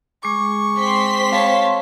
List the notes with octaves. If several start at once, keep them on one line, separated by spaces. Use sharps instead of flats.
G#3 G#4 C#6 D6
C4 C6 B6
C#5 F5 A5